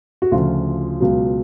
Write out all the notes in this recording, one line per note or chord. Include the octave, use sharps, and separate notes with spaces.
F#4
D2 C#3 F3 F4
C#2 B2 F#3